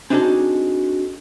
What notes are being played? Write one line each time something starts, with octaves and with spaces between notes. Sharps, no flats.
C4 D4 D#4 F#4 G#4 A4